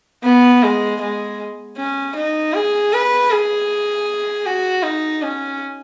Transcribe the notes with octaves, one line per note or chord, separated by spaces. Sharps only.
B3
G#3
G#3
C#4
D#4
G#4
B4
G#4
F#4
D#4
C#4